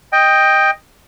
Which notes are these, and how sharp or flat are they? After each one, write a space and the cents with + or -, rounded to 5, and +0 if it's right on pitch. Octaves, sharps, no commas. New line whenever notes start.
D#5 +0 G5 +10